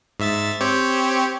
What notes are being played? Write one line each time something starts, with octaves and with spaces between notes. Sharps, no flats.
G#2 E5 A6
C4 G4 C#5